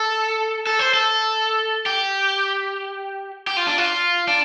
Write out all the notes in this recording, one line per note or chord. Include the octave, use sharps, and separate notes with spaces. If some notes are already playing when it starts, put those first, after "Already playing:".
Already playing: A4
A4
C5
A4
G4
G4
F4
D4
F4
D4